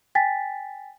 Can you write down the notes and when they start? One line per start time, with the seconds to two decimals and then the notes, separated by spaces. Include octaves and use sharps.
0.15 G5 G#5 A6 B6